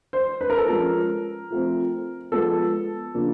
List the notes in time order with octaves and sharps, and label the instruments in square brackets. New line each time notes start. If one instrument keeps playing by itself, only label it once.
[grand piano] C5
B4
A#4
A4
F3 G#3 C#4 A#4
F3 A3 C4
F3 G#3 B3 A4
C#3 F3 A#3 D4